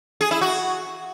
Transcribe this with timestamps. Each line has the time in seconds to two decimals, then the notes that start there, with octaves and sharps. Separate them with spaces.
0.21 G#4
0.31 E4
0.41 F#4